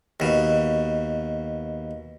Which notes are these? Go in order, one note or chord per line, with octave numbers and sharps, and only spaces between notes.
D#2 B2